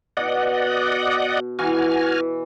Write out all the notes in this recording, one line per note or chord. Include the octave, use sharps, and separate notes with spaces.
B2 D5 D#5 F#5
E3 F#4 G#5 F6